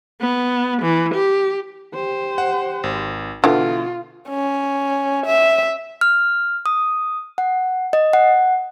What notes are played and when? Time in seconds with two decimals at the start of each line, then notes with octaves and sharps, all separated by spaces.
0.21 B3
0.82 E3
1.14 G4
1.95 G4 C5
2.38 F#5
2.84 G#1
3.44 B2 D3 E3 F4
4.29 C#4
5.26 E5
6.01 F6
6.66 D#6
7.38 F#5
7.93 D#5
8.13 F#5